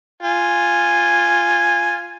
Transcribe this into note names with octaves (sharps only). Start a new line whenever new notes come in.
F4 G#5